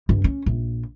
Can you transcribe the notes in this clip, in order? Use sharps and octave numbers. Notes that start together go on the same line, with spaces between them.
G2
C#4
A#1